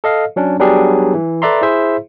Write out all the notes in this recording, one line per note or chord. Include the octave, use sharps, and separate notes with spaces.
A4 D#5 F5
F#3 C#4 D4
F#3 G3 B3 D4 G4 G#4
E3
A4 B4 D5 E5 A#5 C6
E4 G#4 C5 E5